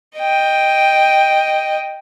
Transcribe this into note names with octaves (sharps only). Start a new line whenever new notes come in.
D#5 G5